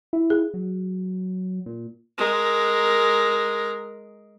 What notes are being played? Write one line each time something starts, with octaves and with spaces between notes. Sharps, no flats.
E4
G#4
F#3
A#2
G#3 A#4